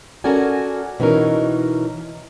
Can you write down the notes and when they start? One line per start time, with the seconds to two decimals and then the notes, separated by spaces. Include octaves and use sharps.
0.24 C#4 F#4 A4 A#4 D5 G#5
1.00 B2 E3 C#4 D#4 A#4